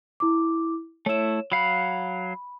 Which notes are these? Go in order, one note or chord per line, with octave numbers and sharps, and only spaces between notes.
E4 D6
A3 E4 C#5 E7
F#3 F5 F#5 B5